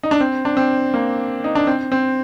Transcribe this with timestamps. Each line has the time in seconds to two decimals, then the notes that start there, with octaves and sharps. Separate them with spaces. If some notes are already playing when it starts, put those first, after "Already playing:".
0.03 D#4
0.11 D4
0.20 C4
0.45 D4
0.57 C4
0.94 A#3
1.44 D#4
1.55 D4
1.67 C4
1.92 C4